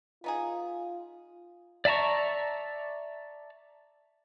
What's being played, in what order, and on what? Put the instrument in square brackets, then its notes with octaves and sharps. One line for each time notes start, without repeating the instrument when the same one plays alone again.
[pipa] B3 D#4 G#4 [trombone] F4
[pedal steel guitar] D5 E5 A5 A#5 C#6